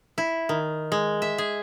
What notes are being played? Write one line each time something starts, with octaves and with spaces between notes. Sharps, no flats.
E4
D#3
G#3
E5
G#4